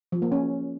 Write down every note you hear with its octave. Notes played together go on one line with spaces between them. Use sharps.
F3
A#3
C#4